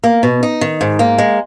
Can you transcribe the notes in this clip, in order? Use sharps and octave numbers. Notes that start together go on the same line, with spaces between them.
A#3
B2
D#4
D#3
G#2
A#3
G#3